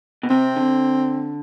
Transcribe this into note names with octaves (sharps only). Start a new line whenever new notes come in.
B2
C3 C4
D3